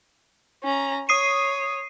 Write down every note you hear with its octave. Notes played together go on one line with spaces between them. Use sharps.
C#4 A#5
C#5 D#6 C7 D#7